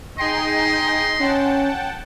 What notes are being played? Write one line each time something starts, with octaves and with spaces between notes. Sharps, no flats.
D#4 G#4 D#5 G5 C6
C#4 F#5 G5 A5